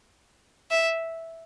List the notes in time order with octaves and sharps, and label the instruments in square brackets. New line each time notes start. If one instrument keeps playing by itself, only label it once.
[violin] E5